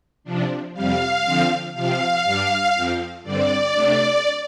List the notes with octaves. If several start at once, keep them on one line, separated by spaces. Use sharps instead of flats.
C3 F3 D4
F2 C3 G3 F5
D3 F3 C4
C3 F3 C4 F5
G2 G3 D4
F2 F3 C4
G2 D3 G3 C4 D5
C3 A3 D4